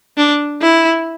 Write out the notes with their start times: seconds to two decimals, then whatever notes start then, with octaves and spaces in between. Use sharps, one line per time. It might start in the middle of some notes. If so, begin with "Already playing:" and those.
0.17 D4
0.62 E4